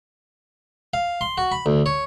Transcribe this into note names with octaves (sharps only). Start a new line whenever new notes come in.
F5
C6
F#4
B5
D2
C#5